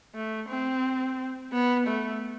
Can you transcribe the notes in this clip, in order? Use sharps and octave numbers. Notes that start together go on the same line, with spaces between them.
A3
C4
B3
A3